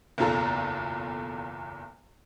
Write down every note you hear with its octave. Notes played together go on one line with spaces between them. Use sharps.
F#1 B1 E2 F4 A4 A#5